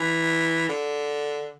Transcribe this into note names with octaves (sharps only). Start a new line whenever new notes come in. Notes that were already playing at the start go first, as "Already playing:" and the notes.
Already playing: E3
D3